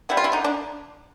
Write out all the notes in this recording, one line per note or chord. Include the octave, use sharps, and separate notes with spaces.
G3 B3 E4
F4
E4
D3 D#4
D4